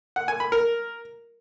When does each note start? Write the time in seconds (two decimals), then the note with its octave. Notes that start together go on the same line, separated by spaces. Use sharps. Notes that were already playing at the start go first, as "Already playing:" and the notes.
0.16 F#5
0.28 G#5
0.40 B5
0.52 A#4